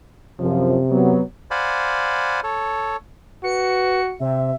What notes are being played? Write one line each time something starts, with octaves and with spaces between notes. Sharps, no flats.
F#2 C3 F3
F#3 B3
C5 D5 F5 F#5 G#5 B5
A4 C#5
F#4 B4 C#7
C3 E5